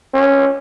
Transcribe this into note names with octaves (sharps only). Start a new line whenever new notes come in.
C#4